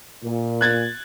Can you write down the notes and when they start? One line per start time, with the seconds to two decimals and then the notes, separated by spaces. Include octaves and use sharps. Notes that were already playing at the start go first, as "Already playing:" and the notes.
0.23 A#2
0.61 F#6 G#6 A6